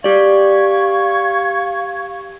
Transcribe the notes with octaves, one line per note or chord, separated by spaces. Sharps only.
G4 D5 F5 C#6 G#6